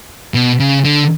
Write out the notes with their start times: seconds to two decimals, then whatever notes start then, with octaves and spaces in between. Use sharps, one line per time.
0.34 B2
0.60 C#3
0.84 D3